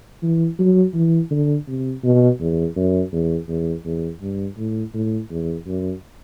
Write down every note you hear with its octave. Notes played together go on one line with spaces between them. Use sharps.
E3
F#3
E3
D3
C3
B2
E2
F#2
E2
E2
E2
G2
A2
A2
E2
F#2